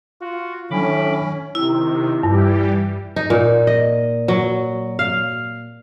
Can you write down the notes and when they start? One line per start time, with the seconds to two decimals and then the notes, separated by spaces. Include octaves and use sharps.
0.21 F4 F#4
0.71 A2 D#3 F#3 C#4 D4 B5 D6
1.55 C3 D#3 E4
2.23 G2 E3 G3 G4
3.16 D#4
3.30 A#2
3.67 D#5
4.28 F#3
4.99 F5